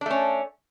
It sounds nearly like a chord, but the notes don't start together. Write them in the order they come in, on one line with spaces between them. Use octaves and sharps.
D4 A3 C#4